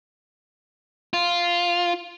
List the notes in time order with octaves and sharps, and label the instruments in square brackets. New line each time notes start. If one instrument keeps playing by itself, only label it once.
[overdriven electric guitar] F4